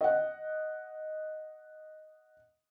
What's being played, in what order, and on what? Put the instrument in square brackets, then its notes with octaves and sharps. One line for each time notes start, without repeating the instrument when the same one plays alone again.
[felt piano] D#5 F#5